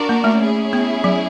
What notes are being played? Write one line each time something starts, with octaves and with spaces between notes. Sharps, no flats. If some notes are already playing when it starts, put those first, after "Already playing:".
Already playing: D4 F#4 A#4 D5
A#3
A3
C#4 E4 G#4
B3
F#3